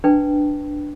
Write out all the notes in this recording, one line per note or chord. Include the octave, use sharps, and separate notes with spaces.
D4 B4 G5 A5